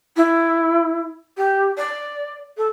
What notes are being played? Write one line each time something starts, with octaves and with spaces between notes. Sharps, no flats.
E4
G4
D5
A4